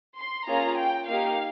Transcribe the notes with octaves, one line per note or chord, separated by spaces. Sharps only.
C6
A#3 C#4 F4 G#4 A#5
G5
A#3 D#4 G4 F5